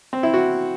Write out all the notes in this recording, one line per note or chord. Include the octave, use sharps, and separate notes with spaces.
C4
E4
F#4